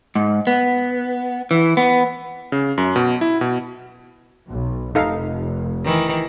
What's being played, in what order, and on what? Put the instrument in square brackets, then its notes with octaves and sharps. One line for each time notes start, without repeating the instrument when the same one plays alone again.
[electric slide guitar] G#2
B3
E3
B3
[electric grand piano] C#3
F#2
B2
E4
B2
[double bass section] B1
[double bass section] F1 [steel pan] D#4 A4 F5
[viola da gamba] D#3 E3